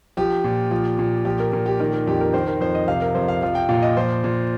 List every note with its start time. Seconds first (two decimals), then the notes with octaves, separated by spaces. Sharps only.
0.17 F3 G4
0.44 A#2
0.71 F3
0.99 A#2
1.25 F3 G4
1.39 A#4
1.52 A#2 A#4
1.66 G4
1.79 D#3 A#4
1.93 A#4
2.07 F2 G4
2.21 A#4
2.33 D#3 C5
2.47 A#4
2.61 F2 C5
2.75 D#5
2.88 C3 F5
3.01 A#4
3.15 F2 C5
3.28 F5
3.42 F3 F5
3.55 G5
3.69 A#2 F5
3.82 D#5
3.96 F3 C5
4.24 A#2